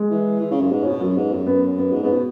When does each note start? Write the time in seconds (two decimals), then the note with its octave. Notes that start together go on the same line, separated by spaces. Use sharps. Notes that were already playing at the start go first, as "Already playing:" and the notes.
Already playing: G#3
0.10 E3
0.40 E3
0.51 C#3
0.61 F#2
0.71 G#2 B3
0.82 C#4
0.86 B2
0.91 B3
1.01 F#2 F#3
1.17 G#2 B3
1.32 F#2 C#4
1.47 B3
1.62 C#4
1.78 B3
1.90 G#2 C#4
2.03 G#2 B3
2.13 B2